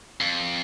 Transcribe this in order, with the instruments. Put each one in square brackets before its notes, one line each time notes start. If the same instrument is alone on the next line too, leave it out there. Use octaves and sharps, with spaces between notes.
[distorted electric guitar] F2